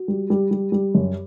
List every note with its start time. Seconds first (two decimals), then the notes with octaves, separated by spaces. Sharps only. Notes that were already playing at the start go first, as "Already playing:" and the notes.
Already playing: F#4
0.08 G3
0.30 G3
0.51 G3
0.72 G3
0.95 F#2